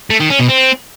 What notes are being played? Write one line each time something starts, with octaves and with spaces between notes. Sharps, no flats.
A3
D#3
C#4
B2
C4